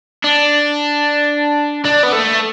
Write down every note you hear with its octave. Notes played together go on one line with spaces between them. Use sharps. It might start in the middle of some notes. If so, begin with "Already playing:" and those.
D4
D4
B3
A3